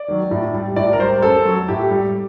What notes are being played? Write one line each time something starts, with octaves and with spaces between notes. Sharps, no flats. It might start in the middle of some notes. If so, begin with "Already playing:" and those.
Already playing: D5
D#3 F#3
A2
G3
A2 D5
A#4
G3 C5
F#2 A4
F#3
A2 G4
G3